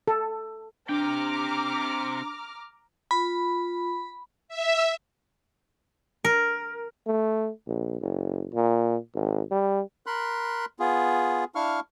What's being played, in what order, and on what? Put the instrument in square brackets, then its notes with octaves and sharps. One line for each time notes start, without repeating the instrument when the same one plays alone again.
[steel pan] A4
[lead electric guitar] C3 G5 [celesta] D4 [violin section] A#5 D6 F6
[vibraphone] F4 [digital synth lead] B5
[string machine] E5
[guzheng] A#4
[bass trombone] A3
A#1
F#1
A#2
G#1
G3
[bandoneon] A#4 B5 C6 F#6
B3 F4 G#4
D4 E4 F5 C#6 F6